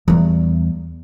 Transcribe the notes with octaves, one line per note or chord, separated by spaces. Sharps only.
E2 G3